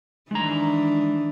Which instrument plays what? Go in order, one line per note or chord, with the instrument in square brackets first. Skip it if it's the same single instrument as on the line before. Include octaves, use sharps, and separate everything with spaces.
[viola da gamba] D#3 E3 D4 [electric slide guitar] G#3 A#5